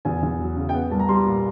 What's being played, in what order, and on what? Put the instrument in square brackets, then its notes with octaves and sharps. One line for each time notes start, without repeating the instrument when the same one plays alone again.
[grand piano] E2 G#5
E2
F#3
C#3
G5
B3 F#5
C2 A5
A#5
G3 C6
A#2